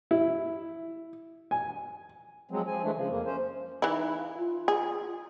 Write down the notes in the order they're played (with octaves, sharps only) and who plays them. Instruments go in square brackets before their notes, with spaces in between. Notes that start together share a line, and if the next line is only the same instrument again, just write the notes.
[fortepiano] E4
G#5
[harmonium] F3 F#3 G#3 C4
F3 G#5
E3 G#3 A3 D4
C#3 F3
F2 A#3
C#4 C5
[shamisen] E3 E4 [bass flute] D#4
[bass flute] F5
F4
[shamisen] G#4